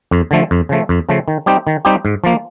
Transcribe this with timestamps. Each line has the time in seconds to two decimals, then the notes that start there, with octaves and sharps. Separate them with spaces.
0.11 F2
0.31 D3 F3 A3
0.51 F2
0.69 C#3 F3 A3
0.89 F2
1.09 C#3 F3 A3
1.28 D#3
1.46 G3 C4 D#4 G4
1.67 D#3
1.85 G3 C4 D#4 G4
2.05 G#2
2.24 F3 A#3